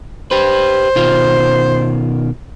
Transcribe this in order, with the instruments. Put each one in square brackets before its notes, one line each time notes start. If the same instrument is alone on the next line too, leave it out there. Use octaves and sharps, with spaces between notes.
[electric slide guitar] G4 B4 [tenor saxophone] C5
[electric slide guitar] B2 D#3 F4